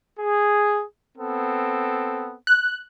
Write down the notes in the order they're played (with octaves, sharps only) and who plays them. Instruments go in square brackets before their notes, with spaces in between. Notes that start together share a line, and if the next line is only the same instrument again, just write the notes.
[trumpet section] G#4
B3 C4 A4
[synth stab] F#6